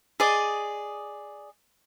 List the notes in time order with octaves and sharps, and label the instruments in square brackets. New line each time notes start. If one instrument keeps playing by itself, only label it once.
[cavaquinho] G#4 D5 D#5